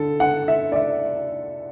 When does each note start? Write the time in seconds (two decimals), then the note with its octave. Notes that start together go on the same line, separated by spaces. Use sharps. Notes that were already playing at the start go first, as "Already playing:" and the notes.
Already playing: D3 A4
0.20 F#5
0.48 E5
0.72 D5
0.76 E5